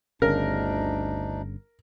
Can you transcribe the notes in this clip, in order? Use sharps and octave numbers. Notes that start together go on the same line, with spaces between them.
G1 D2 C#3 D4 D#4 A#4